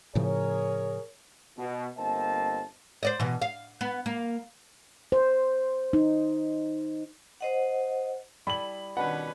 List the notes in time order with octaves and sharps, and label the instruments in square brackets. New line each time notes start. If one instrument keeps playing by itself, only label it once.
[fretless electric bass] A2 C#3 F3 [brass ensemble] G#4 A#4 C#5
[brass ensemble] B2
G1 A#3 C4 D#5 A5
[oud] C5 D5 D#5
B2 E3
F5
B3
A#3
[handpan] C5
D#4
[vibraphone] C5 D#5 F#5
[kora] G3 E4 A4 [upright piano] B5 F#7
[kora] B2 D4 G4 [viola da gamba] D#3 C#4 B4 [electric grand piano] F#5